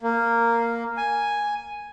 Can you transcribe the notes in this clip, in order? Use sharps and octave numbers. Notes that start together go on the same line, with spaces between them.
A#3
G#5